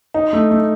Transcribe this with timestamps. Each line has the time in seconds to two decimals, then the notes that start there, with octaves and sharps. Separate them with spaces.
0.14 D#4
0.33 A3
0.51 A3